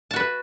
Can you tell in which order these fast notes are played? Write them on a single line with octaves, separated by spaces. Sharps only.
A5 F#4 B4